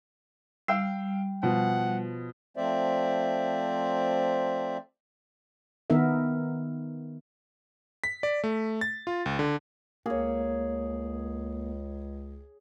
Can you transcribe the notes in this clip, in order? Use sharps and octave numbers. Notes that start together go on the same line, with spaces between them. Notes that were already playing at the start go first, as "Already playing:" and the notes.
G3 F5 G5 E6
B2 F3 F#5
F3 A3 C4 C5 D5 E5
D#3 B3 D#4 A#4 E5
B6
D5
A3
A6
F4
C#2
D3
C#2 A#3 G#4 C#5